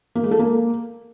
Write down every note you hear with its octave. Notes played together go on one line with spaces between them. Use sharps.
A#3
G#3
A4
A#3